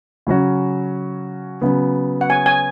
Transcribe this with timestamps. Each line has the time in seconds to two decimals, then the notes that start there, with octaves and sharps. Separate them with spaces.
0.27 C#3 F#3 C#4 F#4
1.62 C#3 F#3 B3
2.21 F#5
2.30 G#5
2.46 G#5